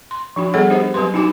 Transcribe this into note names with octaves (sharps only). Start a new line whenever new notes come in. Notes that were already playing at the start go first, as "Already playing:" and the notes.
C6
F3 D4 F#4
G3 B3 G#4 A4 C#5 F#5
D4 G4 C5 D#5
F#3 C4 G4 B4 C6
D4 D#4 F#4 G#5 D6